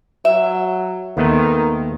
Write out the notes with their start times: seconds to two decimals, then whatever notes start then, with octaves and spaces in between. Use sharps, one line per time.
0.25 F#3 E5
1.17 D#2 D#3 A3 B3